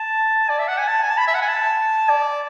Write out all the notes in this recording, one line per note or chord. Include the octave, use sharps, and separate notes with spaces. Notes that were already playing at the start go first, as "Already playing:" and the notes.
Already playing: A5
D5
E5
F#5
G#5
A5
G#5
A5
B5
E5
F#5
G#5
A5
D5